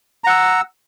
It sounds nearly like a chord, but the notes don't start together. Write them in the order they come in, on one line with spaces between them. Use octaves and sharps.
A#5 F#5 E6